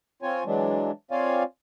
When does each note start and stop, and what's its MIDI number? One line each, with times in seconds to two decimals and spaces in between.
0.22 0.44 60
0.22 0.44 65
0.22 0.44 73
0.22 0.44 80
0.46 0.91 52
0.46 0.91 54
0.46 0.91 56
0.46 0.91 62
1.11 1.43 60
1.11 1.43 65
1.11 1.43 73
1.11 1.43 74
1.11 1.43 77
1.11 1.43 80